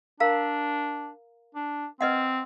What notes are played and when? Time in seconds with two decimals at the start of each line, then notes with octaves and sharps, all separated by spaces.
0.20 D4 A#4 F5 A#5
1.55 D4
2.01 C4 B4 D#5 F#5